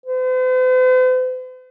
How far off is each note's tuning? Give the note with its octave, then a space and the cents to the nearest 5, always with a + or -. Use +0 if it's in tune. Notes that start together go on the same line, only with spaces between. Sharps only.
C5 -45